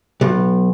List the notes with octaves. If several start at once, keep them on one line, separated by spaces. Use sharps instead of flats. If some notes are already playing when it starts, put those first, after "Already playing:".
B1